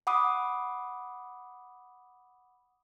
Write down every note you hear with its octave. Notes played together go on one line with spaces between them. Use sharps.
F#5 B5 D6 D#6